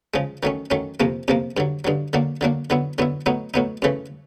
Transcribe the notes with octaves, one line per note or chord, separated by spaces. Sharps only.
C#3 F3 G#3
D#3 F#3 A3 C#4
D#3 F#3 A3 C#4
F2 C3 F3 A#3
F2 C3 F3 A#3
G2 D3 F#3
G2 D3 F#3
D3 F#3 A#3 D4
D3 F#3 A#3 D4
D3 F#3 B3 E4
D3 F#3 B3 E4
A2 F#3 B3 D#4
A2 F#3 B3 D#4
F#2 C#3 E3 A3